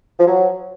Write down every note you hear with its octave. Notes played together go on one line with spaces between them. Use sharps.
F3
F#3